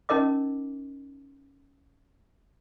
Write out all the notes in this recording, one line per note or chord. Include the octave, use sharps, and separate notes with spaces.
C#4 D#4 A#4 D#5 D6